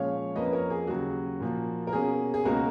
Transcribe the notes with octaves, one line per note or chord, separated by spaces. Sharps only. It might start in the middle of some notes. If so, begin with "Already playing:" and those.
Already playing: A#2 F3 G#3 C#4 C#5 F5
F2 F3 A#3 C#4 B4 D#5
B4
A#4 C#5
G#4
D#2 C#3 F#3 F#4
A#2 F3 A#3
A#4
B2 A#3 C#4 G#4
G#4
C#2 B2 A#3 C#4 F#4 A#4